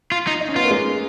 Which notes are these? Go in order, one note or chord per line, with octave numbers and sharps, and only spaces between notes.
F4
D#4
D#4
C#4
B3 F4
A#3
G#3